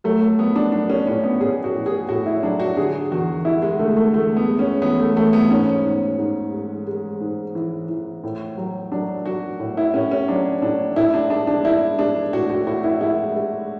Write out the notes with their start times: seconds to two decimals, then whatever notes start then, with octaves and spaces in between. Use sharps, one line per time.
0.04 F#3 A3
0.21 A3
0.38 F#3 B3
0.56 D4
0.72 F#3 D4
0.90 C#4
1.07 A2 C#4
1.23 B3
1.40 A2 G#4
1.64 F#4
1.75 A2
1.86 G#4
2.09 A2 F#4
2.26 E4
2.43 F#3 D4
2.60 F#4
2.77 D3 G#4
3.11 E2 F#4
3.45 G#3 E4
3.62 G#3
3.79 D3 A3
3.97 A3
4.14 E2 A3
4.36 B3
4.48 G#3
4.59 C#4
4.82 E2 B3
4.99 A3
5.17 E2 A3
5.33 B3
5.50 G#2 C#4
5.85 G#2
6.18 G#2
6.52 G#3
6.87 G#3
7.20 G#2
7.55 E3
7.89 E3
8.23 A2
8.57 F#3
8.92 F#3 D4
9.26 F#3 F#4
9.59 A2
9.77 E4
9.93 A2 C#4
10.11 C#4
10.28 F#3 D4
10.62 A2 D4
10.96 A2 E4
11.14 D4
11.30 G#3 D4
11.47 D4
11.64 G#3 E4
11.98 G#3 D4
12.33 A2 F#4
12.50 F#4
12.67 A2 F#4
12.84 E4
13.00 G#3 E4
13.35 G#3